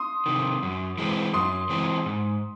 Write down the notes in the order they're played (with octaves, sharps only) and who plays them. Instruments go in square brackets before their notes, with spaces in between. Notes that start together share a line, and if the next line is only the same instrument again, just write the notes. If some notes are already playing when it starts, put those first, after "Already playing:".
Already playing: [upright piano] C6 D#6
[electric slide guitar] C3 D#3
F#2
E3 G#3 C4
[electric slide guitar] F#2 [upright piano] C6 D#6
[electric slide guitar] E3 G#3 C4
G#2